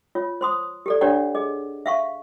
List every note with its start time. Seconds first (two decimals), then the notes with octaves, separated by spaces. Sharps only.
0.15 F4 C#5
0.41 C5 C6 D#6
0.86 G4 A4 D5
1.01 D4 G4 C#5 D5 F#5 A#5
1.35 G#4 D#5
1.86 E5 F5 C#6